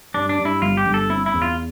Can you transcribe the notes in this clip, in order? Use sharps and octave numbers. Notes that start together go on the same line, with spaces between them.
G2 D4
D4
G2
E4
G1 F4
G4
G1
A4
C4 E4
E4
E2
F4